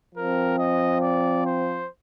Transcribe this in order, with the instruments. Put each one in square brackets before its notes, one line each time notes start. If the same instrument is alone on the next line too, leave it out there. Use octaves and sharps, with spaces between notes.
[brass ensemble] F3 C4 A#4
D#5
D5
C5